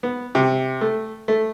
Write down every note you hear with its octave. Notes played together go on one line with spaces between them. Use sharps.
B3
C3
A3
A3